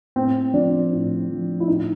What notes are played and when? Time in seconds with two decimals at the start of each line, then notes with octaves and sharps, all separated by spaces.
0.16 A2 C4
0.54 F3 D4
0.92 A2
1.30 F3
1.60 E4
1.68 A2 D#4